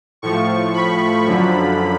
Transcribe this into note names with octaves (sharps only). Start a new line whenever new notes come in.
A2 F3 C#6
B5
F#2 D3 F3